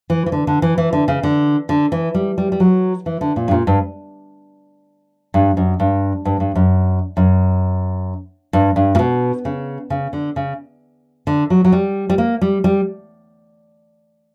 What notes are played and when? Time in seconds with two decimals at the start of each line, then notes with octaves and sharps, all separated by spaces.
0.10 E3
0.26 E3
0.32 D3
0.47 D3
0.62 E3
0.78 E3
0.93 D3
1.08 C#3
1.23 D3
1.69 D3
1.92 E3
2.14 G3
2.38 G3
2.52 G3
2.60 F#3
3.06 E3
3.21 D3
3.36 A#2
3.48 G2
3.51 A#2
3.67 G2
5.34 G2
5.57 F#2
5.80 G2
6.25 G2
6.40 G2
6.55 F#2
7.17 F#2
8.53 G2
8.76 G2
8.95 A#2
8.99 B2
9.45 C#3
9.90 C#3
10.13 D3
10.36 C#3
11.27 D3
11.50 F#3
11.65 F#3
11.72 G3
12.10 G3
12.18 A#3
12.41 G3
12.64 G3